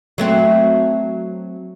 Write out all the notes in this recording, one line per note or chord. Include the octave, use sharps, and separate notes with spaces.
F#3 A3 C4